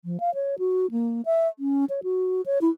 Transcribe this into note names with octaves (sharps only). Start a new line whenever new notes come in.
F3
F5
C#5
F#4
A#3
E5
C#4
C#5
F#4
C#5
E4